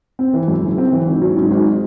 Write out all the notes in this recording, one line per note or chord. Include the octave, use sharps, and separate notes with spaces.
C4
E3
F#2
F#1
C4
E3
G#1
F#3
G#2
G#1